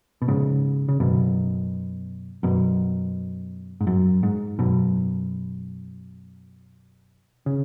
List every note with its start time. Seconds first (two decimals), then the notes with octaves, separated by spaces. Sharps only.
0.22 B2
0.28 G#2 C#3
0.89 C#3
1.00 F#2 B2
2.43 F#2 B2
3.81 G#2
3.87 F#2
4.23 G#2
4.59 F#2 B2
7.46 C#3